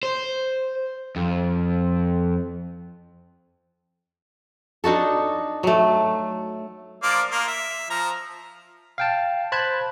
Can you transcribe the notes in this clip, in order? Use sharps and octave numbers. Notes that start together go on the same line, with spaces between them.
C5
F2
D4 D#4 F#4 A4
F#3 A3
F3 A#3 D5
A#3 F4
E5
F3 A#5
F5 G5 A5
C5 A5 B5 F#6 G#6